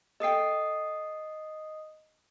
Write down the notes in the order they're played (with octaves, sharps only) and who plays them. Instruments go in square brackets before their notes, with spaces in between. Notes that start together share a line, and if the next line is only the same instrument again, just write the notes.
[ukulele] A4 G5 [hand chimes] D#5 D#6 C7